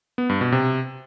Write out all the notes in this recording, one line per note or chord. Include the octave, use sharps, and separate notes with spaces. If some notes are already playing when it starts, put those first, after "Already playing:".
B3
G2
B2
C3